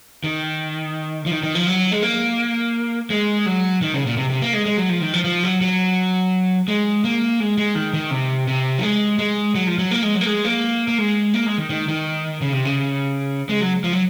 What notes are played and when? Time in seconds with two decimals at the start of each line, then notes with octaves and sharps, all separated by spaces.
0.24 D#3
1.26 F3
1.31 D#3
1.43 D#3
1.55 F3
1.67 F#3
1.92 G#3
2.02 A#3
3.10 G#3
3.46 F#3
3.82 D#3
3.94 C#3
4.06 A#2
4.17 C3
4.29 C3
4.42 A#3
4.53 G#3
4.65 G#3
4.77 F#3
4.89 F3
5.01 D#3
5.14 F3
5.24 F3
5.43 F#3
5.61 F#3
6.68 G#3
7.04 A#3
7.40 G#3
7.58 G#3
7.75 D#3
7.93 D#3
8.11 C3
8.47 C3
8.78 F#3
8.83 G#3
9.19 G#3
9.55 F#3
9.67 F3
9.78 F#3
9.91 A#3
10.03 G#3
10.15 F#3
10.21 A#3
10.26 G#3
10.45 A#3
10.88 A#3
10.98 G#3
11.34 A#3
11.46 G#3
11.58 D#3
11.70 D#3
11.88 D#3
12.41 C#3
12.53 C3
12.65 C#3
13.49 G#3
13.61 F#3
13.84 F3
13.93 F#3